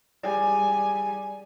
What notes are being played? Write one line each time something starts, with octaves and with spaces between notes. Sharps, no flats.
G3 G4 G#4 D5 G#5